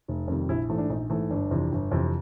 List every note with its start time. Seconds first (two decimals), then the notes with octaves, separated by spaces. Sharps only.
0.08 F1
0.28 F2 C3 D#3 G3
0.49 A#1 E4
0.69 G#2 E3 A3
0.78 D4
0.90 A#1 D#4
1.10 G#2 E3 A3
1.30 G1 D4
1.51 F2 C3 E3
1.72 G1
1.91 F2 C3 E3